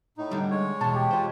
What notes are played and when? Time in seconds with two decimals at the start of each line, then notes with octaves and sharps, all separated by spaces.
0.18 A2 D#4
0.31 D3 G3
0.51 G#3 C#5
0.81 E2 B2 A5
0.95 G4
1.11 F4 C5